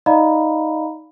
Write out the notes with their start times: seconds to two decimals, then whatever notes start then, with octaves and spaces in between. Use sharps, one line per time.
0.06 D#4 D5 D#5 F5 A#5 B5